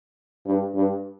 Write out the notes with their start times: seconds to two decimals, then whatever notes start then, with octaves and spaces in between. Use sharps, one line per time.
0.46 G2
0.75 G2